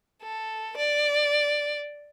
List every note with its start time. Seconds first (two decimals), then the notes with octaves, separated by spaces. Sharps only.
0.23 A4
0.78 D5